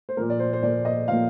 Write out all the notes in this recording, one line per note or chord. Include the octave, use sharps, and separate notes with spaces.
C5
A#2 F3 A#3 A#4
D5
C5
C5
A#2 F3 A#3 D5
D#5
A#2 F3 A#3 F5